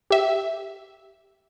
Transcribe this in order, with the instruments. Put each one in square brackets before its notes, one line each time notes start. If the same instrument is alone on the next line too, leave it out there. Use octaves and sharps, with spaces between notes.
[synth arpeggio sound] G4 E5